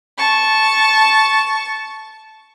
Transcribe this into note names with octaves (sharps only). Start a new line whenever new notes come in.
A5 C#6